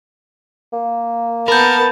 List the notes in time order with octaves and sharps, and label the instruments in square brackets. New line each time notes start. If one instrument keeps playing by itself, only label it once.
[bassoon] A#3
[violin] B3 A5 [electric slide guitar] A#4 [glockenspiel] B5 G6